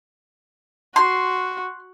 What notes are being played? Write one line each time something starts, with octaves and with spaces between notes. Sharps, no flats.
F#4 C6